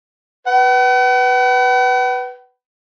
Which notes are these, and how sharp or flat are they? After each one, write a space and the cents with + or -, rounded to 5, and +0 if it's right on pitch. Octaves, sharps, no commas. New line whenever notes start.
B4 +0 F#5 +45